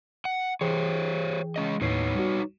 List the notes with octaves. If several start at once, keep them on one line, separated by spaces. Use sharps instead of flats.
F#5
E3 G4 G#4 C5 C#5 G5
G#3 C#4 D#5
D#2 A2 D#4 B4 C#5 C7
G3 F#4